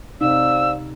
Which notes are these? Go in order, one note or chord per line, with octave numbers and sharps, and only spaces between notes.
C3 C4 D#4 D5 F5 E6